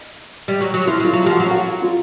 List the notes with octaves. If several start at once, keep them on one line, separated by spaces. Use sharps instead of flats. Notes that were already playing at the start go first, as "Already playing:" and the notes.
G3
F#3
F#3
F3 E4
F#3
F4
F#3
F3 G4
F#4
F#3 F4
F#4
F4